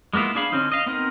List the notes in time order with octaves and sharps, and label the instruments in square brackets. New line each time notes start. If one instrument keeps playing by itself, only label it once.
[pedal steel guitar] G#3 A#3 B3 E4 F4
D4 G#4 F5 B5
D3 C4 C#4 D#4
D#5 F5
B3 C4 D#4 A#4